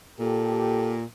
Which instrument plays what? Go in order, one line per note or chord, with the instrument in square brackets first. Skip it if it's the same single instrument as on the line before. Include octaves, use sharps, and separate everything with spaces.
[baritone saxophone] A#2 [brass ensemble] G4 A4